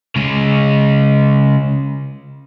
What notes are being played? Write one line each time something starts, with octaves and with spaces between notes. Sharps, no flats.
C#3 G#3